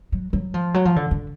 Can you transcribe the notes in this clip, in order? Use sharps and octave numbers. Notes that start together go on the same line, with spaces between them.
F#3
F#3
F3
F#3
F3
D3
D3